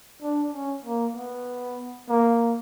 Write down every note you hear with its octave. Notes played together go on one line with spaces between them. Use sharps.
D4
C#4
A#3
B3
A#3